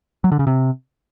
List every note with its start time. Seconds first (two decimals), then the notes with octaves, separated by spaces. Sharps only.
0.24 F#3
0.32 D3
0.39 C#3
0.47 C3